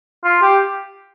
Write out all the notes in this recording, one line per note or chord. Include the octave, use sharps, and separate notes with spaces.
F4
G4